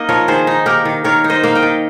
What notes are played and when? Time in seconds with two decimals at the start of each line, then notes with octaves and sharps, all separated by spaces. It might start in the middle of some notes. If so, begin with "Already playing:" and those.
Already playing: A#3 D#4 D#5
0.09 F3 A#4 C#5
0.28 D#3 G#4 C5
0.47 D#4
0.66 A#3 G4 A#4
0.85 D#3
1.04 D#3 A#4 C#5
1.24 D#4
1.30 C5 D#5
1.44 A#3 F5
1.55 D#5 G5
1.63 D#3